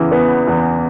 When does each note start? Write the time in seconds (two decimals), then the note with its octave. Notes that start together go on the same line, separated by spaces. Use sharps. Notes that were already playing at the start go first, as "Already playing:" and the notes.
Already playing: E2 C#3 E3
0.12 B3
0.47 E2